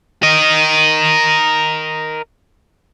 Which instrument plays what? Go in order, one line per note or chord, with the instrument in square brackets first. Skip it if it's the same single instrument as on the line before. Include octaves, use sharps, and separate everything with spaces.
[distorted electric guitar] A#4 D#5